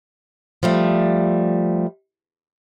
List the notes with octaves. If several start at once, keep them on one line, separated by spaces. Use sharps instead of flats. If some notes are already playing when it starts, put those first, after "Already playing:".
F3 G3 A3